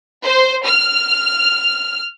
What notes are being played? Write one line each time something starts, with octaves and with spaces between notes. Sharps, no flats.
C5
F6